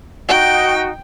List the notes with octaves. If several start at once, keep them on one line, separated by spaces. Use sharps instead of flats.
D#4 F#4 G5